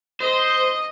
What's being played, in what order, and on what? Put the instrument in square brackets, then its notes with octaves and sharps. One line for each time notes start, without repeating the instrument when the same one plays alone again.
[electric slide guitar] C5 [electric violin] D#5